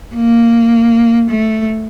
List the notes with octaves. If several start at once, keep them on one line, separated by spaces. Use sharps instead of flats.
A#3
A3